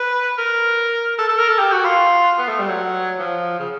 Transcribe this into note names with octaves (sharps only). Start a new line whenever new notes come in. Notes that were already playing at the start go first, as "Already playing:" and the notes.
Already playing: B4
A#4
A4
A4
A#4
A4
G4
F#4
F4
B3
A3
G3
F#3
F3
C#3